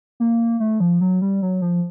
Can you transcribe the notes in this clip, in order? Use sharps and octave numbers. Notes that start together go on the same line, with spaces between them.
A#3
A3
F3
F#3
G3
F#3
F3